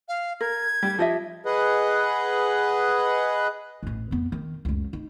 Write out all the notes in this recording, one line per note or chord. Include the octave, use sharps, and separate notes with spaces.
F5
A#4 G#6
G3 G4
F3 G4 D#5 E5
G#4 B4 D#5 F#5
A1 A2
F2 B3
D#3
C#2 F#2
D#4